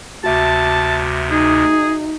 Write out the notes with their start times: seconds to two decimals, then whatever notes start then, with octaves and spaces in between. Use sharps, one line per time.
0.24 D2 C3 F#4 E5 A5
1.30 D#4 G#4